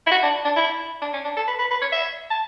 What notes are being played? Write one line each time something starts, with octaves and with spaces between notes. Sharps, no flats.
E4
F#4
D4
D4
E4
D4
C#4
D4
A4
B4
B4
B4
C#5
E5
A5